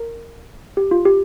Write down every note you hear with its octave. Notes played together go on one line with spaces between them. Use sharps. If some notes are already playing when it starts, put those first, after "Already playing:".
Already playing: A#4
G4
F4
G4